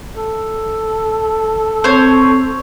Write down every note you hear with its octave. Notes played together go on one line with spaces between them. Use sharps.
A4
C4 C5 C#5